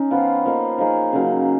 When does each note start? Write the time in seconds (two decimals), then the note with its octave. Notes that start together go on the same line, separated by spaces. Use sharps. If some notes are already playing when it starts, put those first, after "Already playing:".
Already playing: C#4 D#4
0.11 F3 B3 F4
0.45 F3 A#3 D#4
0.78 F3 A#3 D#4 G#4
1.13 C#3 F#3 A#3